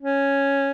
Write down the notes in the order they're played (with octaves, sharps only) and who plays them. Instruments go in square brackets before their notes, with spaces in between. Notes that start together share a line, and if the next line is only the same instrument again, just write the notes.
[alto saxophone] C#4